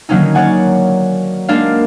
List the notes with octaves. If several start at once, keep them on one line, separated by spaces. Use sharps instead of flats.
D3 D#3 F#3 A#3 C#4 D#4
C#5 D5 F#5 G#5
G#3 A#3 D4 D5 F5